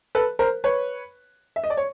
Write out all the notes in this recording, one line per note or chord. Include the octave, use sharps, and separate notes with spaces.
A4 B4
A#4 C5
B4 C#5
E5
D#5
D5
C#5